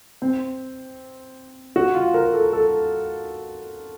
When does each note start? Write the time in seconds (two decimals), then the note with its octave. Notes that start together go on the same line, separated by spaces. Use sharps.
0.22 C4
1.76 F#4
1.95 F4
2.14 A#4
2.33 A4
2.53 A4